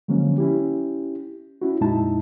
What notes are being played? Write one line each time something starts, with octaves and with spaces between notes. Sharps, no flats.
D3 F3 F#3 G#3 A#3 C#4
C#4 E4 G4
C#4 E4 F#4
F2 A#2 G#3 D#4 E4 A5